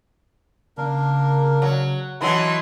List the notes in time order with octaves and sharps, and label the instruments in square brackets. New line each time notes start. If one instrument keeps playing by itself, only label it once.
[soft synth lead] C#3 [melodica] A#3 D4 A#4
[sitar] F#3
[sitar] E3 F#3 [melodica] D#5 A5 [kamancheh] C6